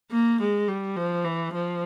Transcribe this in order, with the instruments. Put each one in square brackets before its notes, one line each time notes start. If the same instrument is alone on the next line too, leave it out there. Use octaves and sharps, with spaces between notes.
[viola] A#3
G#3
G3
F3
E3
F3